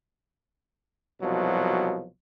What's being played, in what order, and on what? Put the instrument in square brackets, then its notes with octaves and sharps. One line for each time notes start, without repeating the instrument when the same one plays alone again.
[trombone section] C2 B2 F3 F#3